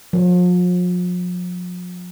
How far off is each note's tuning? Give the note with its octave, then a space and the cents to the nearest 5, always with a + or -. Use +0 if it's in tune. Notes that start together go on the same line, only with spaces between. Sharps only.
F3 +40